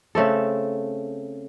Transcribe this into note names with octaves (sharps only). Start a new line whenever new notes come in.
C#3 A3 C4 A4